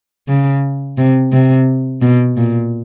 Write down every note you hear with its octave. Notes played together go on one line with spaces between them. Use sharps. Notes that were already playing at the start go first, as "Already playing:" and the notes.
C#3
C3
C3
B2
A#2